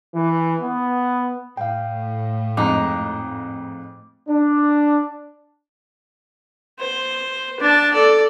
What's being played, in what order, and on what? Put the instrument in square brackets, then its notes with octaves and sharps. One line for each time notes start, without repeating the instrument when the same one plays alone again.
[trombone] E3
B3
[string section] A2 [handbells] F5 G5
[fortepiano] F2 G#2 [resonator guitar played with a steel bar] D#4 [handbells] D6
[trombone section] D4
[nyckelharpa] C5
D4 A5
A4 D5